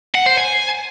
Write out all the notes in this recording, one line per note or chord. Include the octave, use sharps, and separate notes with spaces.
F#5
C5
G#5